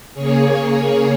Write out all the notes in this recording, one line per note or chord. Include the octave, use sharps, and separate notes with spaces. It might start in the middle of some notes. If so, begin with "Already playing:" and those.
C#3 A#3 G#4 C#5